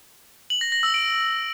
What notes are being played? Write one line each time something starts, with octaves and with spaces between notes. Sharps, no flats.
F#7
A#6
A#6
E6
D7